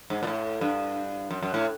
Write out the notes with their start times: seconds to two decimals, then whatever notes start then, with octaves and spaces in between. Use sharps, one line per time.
0.10 G#2
0.23 A#2
0.27 A2
0.61 G2
1.31 F#2
1.43 F#2
1.54 A2